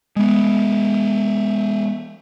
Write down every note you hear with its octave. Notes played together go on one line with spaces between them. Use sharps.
G#3 B3